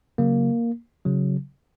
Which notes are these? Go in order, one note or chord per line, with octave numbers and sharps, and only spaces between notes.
C#3 F#3 A#3
C#3 F#3